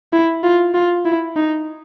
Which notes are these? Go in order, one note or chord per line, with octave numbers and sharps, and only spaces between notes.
E4
F4
F4
E4
D#4